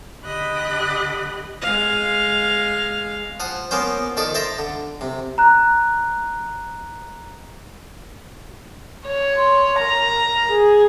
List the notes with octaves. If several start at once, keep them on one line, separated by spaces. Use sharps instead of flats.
D3 G4 D#5 B5 F#6
G#3 F5
F3 F#5 G#5
F3 A#3 B3 C#4 C5
D#3 F3 A4 D5
C5 E5 A5 A#5
D3
C3
A#5 F#6
C#5
C6
A#4 A#5
A#4
G#4